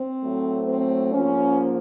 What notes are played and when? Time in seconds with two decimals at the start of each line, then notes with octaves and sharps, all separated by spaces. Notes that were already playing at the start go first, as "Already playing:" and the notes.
Already playing: C4
0.22 A2 F#3 A3
0.67 C4
1.12 G#2 F3 A#3 C#4